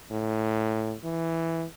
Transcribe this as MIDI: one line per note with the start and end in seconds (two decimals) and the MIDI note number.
0.11 0.95 45
1.04 1.65 52